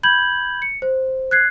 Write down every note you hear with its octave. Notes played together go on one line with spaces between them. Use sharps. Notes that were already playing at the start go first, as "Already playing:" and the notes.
B5 G6 G#6 F#7
C#7
C5
F#6 G#6 C7